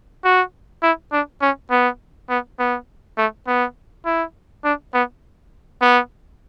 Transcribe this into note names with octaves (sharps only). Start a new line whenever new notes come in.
F#4
E4
D4
C#4
B3
B3
B3
A3
B3
E4
D4
B3
B3